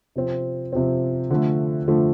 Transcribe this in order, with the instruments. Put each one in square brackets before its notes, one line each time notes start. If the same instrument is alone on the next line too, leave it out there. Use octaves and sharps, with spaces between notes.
[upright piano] C3 F3 C4
C3 F3 C4
D3 F3 A3
D3 F3 A3